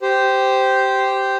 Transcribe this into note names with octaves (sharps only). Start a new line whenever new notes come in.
G4 C5